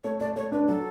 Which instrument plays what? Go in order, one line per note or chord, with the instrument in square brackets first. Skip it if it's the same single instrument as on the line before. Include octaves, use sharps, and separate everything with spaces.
[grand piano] A3 [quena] C#5
[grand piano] A3 [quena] D5
[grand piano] A3 [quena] C#5
[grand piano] D4 [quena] B4
[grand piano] F#3 [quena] A4